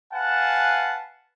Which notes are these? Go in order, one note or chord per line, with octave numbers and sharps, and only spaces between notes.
B4 F5 F#5 G#5 A5